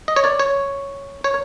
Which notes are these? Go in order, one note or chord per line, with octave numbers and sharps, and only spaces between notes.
D#5
C#5
D5
C#5
C#5